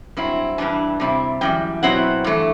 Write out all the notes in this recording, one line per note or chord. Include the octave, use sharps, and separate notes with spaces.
G2 F#3 C4 E4
G2 E3 G3 D4 A5
C3 G3 C4 E4
F#2 E3 G3 G5
B2 F#3 C4 E4 F#5
G2 E3 A3